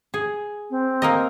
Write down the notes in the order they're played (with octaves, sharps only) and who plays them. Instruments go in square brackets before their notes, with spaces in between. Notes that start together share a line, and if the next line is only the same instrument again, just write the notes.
[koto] G#4
[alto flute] C4
[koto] A#3 A#4 D#5